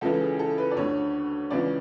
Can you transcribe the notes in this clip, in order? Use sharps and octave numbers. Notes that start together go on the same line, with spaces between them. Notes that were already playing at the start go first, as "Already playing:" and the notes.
C#2 C#3 E3 A4
G#4
A4
B4
D5
D2 D3 C#5
C#2 C#3 E3 D5